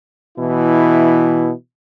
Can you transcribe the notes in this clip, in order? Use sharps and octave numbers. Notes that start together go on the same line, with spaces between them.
B2 E3 E4